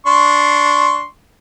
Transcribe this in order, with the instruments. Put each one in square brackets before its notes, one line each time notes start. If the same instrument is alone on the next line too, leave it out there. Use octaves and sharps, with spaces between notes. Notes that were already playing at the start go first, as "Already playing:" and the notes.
[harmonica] D4 C6 C#6